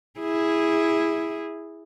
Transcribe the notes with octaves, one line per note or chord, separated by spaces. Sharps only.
E4 G#4